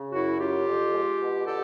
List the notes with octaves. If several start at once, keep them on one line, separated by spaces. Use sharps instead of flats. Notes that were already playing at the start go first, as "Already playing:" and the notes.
Already playing: C#3
F#2 E4 F#4
C#3 F4 G4
F2
G#3
B2
D3 G4 A4